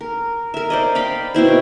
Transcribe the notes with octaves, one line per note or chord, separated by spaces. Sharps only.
A#4
A#4 E5
C5 D5 D#5
D5 F5 G5 B5
B2 C4 E4 C5